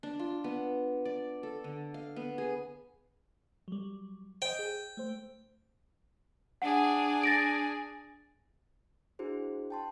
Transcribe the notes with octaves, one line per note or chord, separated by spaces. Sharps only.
D4
F4
B3
D5
A4
D3
F5
B3
G#4
F#3 G3
C5 D#5 G5
G#4
A3 C5
D4 G#4 F#5
A6 A#6 D7
D4 E4 F#4 G#4 C5
G5 A5 C6